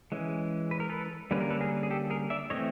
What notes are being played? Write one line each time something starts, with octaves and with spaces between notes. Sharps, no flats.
E3 G#3 C#4
B4
A#4
A4 B4
D3 G3 A#3 C#4 B4
A#4
A4 B4
G#4 A#4
G#4
G4 A4
G#4 A#4
D5 E5
E3 A3 C4 C#5 D#5